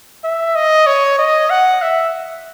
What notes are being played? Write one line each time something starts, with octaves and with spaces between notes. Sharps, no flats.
E5
D#5
C#5
D#5
F#5
E5